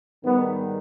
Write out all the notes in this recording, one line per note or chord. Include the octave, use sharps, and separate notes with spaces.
G#2 D#3 G3 B3